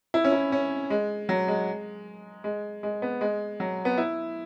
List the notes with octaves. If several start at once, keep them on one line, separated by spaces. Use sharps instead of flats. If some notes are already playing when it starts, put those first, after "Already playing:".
E4
C#4
E4
C#4
G#3
F#3
G#3
G#3
G#3
B3
G#3
F#3
B3
E4